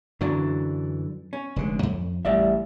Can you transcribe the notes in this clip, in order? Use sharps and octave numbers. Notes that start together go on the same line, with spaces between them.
F#2 D3 E3 F#3 D4
C#4
F1 D3 G#3
F2
A1 G3 D5 E5